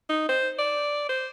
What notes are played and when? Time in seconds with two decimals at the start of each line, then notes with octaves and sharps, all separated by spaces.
0.09 D#4
0.29 C5
0.58 D5
1.09 C5